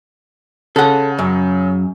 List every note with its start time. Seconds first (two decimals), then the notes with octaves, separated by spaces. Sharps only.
0.76 C#3 A4 F#5
1.19 F#2